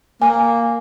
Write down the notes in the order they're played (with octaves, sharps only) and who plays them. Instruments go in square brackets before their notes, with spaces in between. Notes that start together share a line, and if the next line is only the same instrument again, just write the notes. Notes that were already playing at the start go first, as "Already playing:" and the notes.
[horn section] A#3 [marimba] G#5